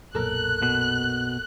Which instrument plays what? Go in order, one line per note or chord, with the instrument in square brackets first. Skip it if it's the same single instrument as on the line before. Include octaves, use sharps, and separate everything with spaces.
[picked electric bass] B1 F#2 A#2 [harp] A4 A#4 [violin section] F#6
[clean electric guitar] B2